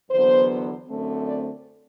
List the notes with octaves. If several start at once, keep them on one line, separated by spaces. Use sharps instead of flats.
E2 D3 F#3 B3 C5
F#2 D3 A3 C4
D5